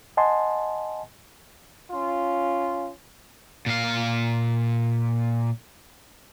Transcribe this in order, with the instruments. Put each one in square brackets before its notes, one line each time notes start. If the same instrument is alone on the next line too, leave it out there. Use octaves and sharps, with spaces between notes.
[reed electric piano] D#5 F#5 G#5 A5 C6
[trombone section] C#4 F4
[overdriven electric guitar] A#2 F5